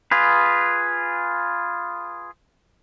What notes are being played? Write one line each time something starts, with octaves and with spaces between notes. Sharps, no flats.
F4 G#4 B4